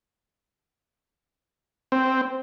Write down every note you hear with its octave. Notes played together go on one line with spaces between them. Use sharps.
C4